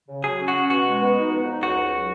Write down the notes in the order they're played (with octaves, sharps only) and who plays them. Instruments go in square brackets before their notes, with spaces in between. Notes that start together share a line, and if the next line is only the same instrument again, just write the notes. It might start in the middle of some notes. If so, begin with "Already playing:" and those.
[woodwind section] C#3
[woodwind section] F#3 [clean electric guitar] G#4
[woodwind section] C#4
[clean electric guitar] F#4
[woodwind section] C#4
[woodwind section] B2 [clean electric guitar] F#4
[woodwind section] G#3
B3
D#4
F2
D#4
[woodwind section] C#2 [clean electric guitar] F#4
[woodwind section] C#2
F#3